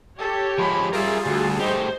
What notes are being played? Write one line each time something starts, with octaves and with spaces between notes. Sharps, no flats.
G4 A4 C#5
F3 G#3 B5
G3 F4 G#4 A#4 E5
D2 F#4 A4
A3 D#4 G4 C5